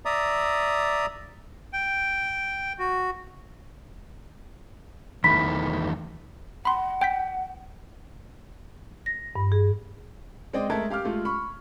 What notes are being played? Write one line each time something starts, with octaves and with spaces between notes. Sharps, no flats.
D5 E5 A#5 D#6
G5
F#4
E2 D#3 A3 B5 B6
F#5 B5 C6
G5 G6 B6
A#6
G2
G#4
G#3 C4 D5 D#5 G5
G#3 A3 A#4 E5 A5 G#6
G4 F5 D6 F6
G#3 A3 F4
B5 C#6